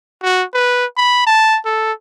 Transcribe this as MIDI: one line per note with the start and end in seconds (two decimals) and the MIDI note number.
0.23 0.43 66
0.54 0.86 71
0.97 1.26 83
1.27 1.58 81
1.66 1.92 69